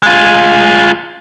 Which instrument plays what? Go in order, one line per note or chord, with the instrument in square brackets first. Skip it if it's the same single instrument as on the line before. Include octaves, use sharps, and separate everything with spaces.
[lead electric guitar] G#3 F4